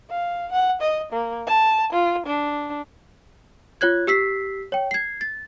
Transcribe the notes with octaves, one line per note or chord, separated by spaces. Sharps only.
F5
F#5
D#5
A#3
A5
F4
D4
F4 C#5 F#6 G#6
G4 E6 B6 C7
C#5 G5
G#6 C7
A6